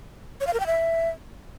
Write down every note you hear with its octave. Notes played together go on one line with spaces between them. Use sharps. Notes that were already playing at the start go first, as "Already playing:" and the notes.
C#5
F5
A#4
G5
E5